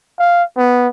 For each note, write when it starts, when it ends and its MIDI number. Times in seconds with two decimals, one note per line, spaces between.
0.19 0.43 77
0.57 0.88 59